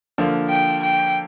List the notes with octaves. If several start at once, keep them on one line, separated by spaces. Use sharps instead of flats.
D3 F3 A#3
G5
G5